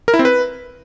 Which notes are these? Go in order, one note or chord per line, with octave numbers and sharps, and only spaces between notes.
A#4
E4
C4
B4